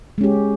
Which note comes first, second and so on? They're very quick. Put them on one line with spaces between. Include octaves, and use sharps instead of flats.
G#3 C#4 G4